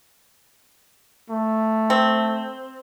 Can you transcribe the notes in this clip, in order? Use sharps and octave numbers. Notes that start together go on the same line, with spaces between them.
A3
C4